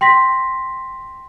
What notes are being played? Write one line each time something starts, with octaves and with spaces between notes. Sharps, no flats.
G5 C6 A#6 B6